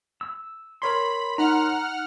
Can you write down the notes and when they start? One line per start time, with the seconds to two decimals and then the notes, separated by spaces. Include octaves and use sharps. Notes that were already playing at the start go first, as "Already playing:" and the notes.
0.21 E6
0.82 A#4 C#5 B5 C6
1.38 D#4 F#5 A#5 F6